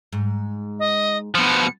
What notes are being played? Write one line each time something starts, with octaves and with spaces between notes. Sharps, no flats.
G#2
D#5
B2 F3 C#7